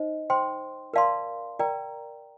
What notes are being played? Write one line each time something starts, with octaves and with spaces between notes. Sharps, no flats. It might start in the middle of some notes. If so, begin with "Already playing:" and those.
Already playing: D#4 C5 D#5
C5 G5 C6
A#4 D5 F5 A5 C6
A#4 D5 G5 A#5